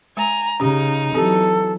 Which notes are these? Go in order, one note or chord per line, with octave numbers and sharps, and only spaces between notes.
G#3 G#5 A#5
C#3 C#4 D#4 G4
E3 F#3 C4 G4 A4